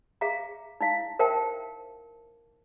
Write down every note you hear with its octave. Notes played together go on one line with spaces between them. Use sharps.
G#4 E5 F5 A#5
D#4 E4 F5
A#4 C5 E5 G5 A5